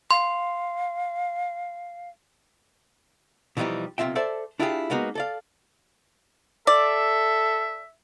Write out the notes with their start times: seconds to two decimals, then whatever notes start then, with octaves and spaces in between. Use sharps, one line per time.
0.11 F5 C6
3.57 B2 E3 F3 G3 D#4 G4
3.98 B1 C3 A3 F4 E5 G5
4.15 A4 C5 D5 E5 A5
4.59 D4 E4 F4 G4 G#4 G5
4.90 G#3 A#3 B3 D#4 F#4
5.15 A4 D5 F5
6.67 A4 D5 E5 D6